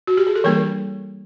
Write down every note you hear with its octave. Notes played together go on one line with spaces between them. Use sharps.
F#4
G4
G#4
A4
E3 G3 A#3 D4 A#4